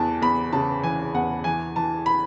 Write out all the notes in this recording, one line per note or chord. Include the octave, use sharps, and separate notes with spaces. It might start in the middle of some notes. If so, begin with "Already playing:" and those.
Already playing: E2 E3 A5
E2 B5
C#3 A5
E3 G#5
E2 F#5
E3 G#5
E3 A5
B5